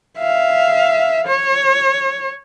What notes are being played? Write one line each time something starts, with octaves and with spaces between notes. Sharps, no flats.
E5 F5
C#5